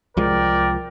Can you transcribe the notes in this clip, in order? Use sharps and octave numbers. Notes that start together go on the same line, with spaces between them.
C2 F3 G#3 A#4 D5 G5